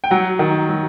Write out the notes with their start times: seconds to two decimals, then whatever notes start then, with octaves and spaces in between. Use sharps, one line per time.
0.04 G5
0.11 F#3 F#5
0.39 D#3
0.69 F#3